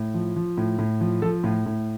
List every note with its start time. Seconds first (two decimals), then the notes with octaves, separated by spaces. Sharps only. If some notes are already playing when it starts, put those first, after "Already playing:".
Already playing: A2
0.14 F3
0.36 F3
0.57 A2
0.79 A2
1.01 F3
1.22 F3 A4
1.44 A2 F4
1.66 A2